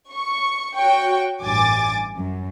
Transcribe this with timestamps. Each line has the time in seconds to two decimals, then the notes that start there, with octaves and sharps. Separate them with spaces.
0.12 C#6
0.75 F#4 C#5 G5 C#6
1.41 A1 G2 G#5 D6 A6
2.15 F#2